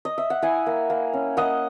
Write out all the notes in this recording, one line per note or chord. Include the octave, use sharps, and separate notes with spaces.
D#5
E5
F#5
E4 E5 G#5
A#3
A#3
C#4
A#3 D#5 F#5